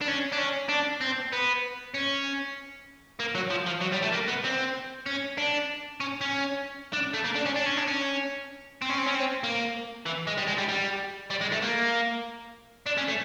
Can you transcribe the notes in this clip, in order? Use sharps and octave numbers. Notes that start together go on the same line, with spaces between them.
D4
C#4
D4
C#4
D4
C4
B3
C#4
A#3
F#3
F3
F3
F#3
G3
A3
A#3
B3
C4
C#4
D4
C#4
C#4
D4
A3
A#3
D4
C#4
D4
C#4
D4
C#4
C4
C#4
C4
C#4
C4
A#3
E3
G#3
G3
G#3
G3
G3
G3
G#3
A3
A#3
D4
C#4
A3